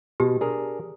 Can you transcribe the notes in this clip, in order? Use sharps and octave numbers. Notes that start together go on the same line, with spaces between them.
B2 G4
D4 G#4 A#4